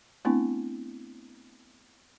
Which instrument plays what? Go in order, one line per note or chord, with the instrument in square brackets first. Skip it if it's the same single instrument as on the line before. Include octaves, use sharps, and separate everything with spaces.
[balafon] A3 B3 C4 D4 E4